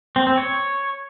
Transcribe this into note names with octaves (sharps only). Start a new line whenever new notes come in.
C4
C4
C#5